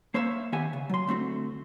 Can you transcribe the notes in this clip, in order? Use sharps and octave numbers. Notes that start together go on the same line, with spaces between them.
A#3 C5 C#5 E5 F5
D#3 B3 G4 E5 F#5 G#5
C#3
F#3 C6
D2 A3 C4 F#4